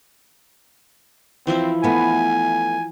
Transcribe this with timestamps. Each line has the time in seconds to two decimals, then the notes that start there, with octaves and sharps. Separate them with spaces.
1.47 E3 F3 C4 E4
1.84 A3 B3 G#5